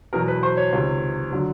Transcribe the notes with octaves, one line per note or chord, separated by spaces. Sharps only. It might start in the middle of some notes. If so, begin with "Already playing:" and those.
E2 B2 F#3 A#4
B4
C5
C#5
C#2 C3 D#3
D3 F#3